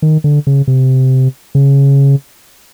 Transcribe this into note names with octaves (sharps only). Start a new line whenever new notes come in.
D#3
D3
C#3
C3
C#3